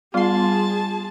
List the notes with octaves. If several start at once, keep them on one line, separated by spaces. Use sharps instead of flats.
G3 B3 F4 G#4 F5 A5 C6